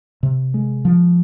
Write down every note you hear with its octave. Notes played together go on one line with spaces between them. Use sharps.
C3
G#3
F3